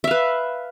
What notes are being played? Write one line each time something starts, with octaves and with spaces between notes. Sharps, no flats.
B4 E5 F5